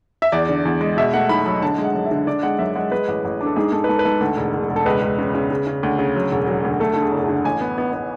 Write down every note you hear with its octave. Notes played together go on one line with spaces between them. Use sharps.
E5
E2 D5
D3
E2
G#3
B2 E5
A3 F#5
B1 B5
F#3 B5
D3 A5
G#3
F#5
F#2
E5
D3
D3 D5
G#3 F#5
F#2 E5
G#3 F#5
G#3 B4
A1
A1
D4
A4
G#2 G#4
G#2 A4
B4
G#2 A4
B4
G#2 A4
D2 A4
E1
E1
E1
A4
C#2 B4
C#2
C#3
C#3
C#3
C#3
D2
C#3
F#3
E1
F#3
D2
A3 A4
D3 A4
G#4
F#1
G#4
D3 A4
A1 G#5
B3
B3
B3